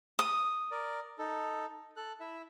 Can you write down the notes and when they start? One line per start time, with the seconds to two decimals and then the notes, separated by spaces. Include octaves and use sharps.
0.19 D#6
0.71 A#4 D5
1.19 D#4 A4
1.96 A4 F#6
2.20 E4 E5